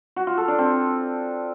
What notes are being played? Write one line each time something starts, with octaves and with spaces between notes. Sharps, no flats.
F#4
F4
A4
D4
C4